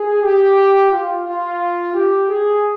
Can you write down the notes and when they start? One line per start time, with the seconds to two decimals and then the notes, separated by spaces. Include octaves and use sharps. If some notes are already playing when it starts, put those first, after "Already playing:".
Already playing: G#4
0.22 G4
0.91 F4
1.25 F4
1.94 G4
2.29 G#4